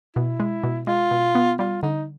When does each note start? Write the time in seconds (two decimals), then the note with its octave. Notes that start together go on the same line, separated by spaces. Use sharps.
0.15 B2 E4
0.40 G#3
0.64 B2
0.87 G#3 F4
1.11 B2
1.35 B3
1.59 G3 F4
1.83 D3 D#4